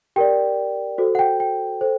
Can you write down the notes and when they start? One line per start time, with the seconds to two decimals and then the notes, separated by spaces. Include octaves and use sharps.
0.16 G4 A#4 D5 G5
0.98 F#4 A4 C5
1.15 F#5
1.19 G5
1.40 G5
1.81 A4 C5